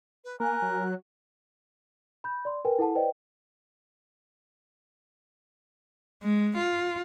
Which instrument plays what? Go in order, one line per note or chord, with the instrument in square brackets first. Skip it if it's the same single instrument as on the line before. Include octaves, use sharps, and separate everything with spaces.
[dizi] B4
[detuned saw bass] A#3 [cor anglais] A#4 [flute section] G#5 [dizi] F#6
[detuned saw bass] F#3
[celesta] B5 G6
D5 C6
A#4 B4 G5 G#5
E4 A4 F#5 A5
B4 C5 D5 D#5 G5
[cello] G#3
F4